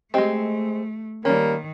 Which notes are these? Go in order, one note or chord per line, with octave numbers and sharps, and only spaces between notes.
G#3 A3 C4 G4 D#5 G5
D#3 G3 A#3 C#4